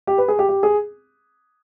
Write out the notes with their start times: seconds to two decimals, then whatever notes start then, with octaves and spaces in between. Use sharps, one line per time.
0.07 G4
0.18 B4
0.28 G#4
0.39 G4
0.49 G4
0.63 G#4